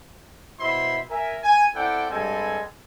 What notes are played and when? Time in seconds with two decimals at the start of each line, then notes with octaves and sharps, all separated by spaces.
0.60 B2 E4 C5 E5 B5 C6
1.10 A#4 E5 G#5
1.44 G#5
1.75 C4 E4 A4 D5 F#5 G5
2.11 G2 G3 G#3 C4 A4 G#5